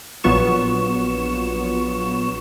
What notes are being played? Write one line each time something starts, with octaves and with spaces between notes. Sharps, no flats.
A#1 F#3 B3 F4 C#6 E7